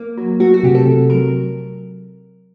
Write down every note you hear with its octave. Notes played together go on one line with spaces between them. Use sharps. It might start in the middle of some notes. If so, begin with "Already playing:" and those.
Already playing: A#3
F#3
A3 F#4
F#4
C3 G4
A4
C3
F#3 A#4